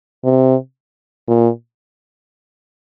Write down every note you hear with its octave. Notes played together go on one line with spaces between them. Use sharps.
C3
A#2